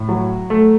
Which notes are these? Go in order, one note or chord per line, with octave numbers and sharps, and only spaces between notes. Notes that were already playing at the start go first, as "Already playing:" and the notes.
Already playing: A2
F#3
A3